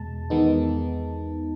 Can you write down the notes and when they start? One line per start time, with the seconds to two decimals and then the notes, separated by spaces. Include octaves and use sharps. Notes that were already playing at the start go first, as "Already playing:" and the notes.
Already playing: E2 B2 G#3 A5
0.30 E2 D#3 G#3 B3 D#4